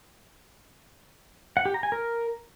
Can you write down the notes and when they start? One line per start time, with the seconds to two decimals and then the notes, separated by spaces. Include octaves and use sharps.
1.57 F#5
1.66 G4
1.74 A#5
1.83 G#5
1.92 A#4